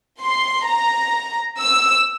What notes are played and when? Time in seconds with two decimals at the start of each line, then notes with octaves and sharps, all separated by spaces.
0.22 C6
0.66 A#5
1.60 E6